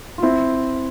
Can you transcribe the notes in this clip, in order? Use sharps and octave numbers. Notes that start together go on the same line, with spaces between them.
F4
C4 E4